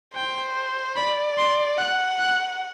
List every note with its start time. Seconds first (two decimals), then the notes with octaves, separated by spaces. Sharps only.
0.15 C5 G5
0.97 D5 B5
1.38 C6
1.78 F#5 F#6
2.19 F#6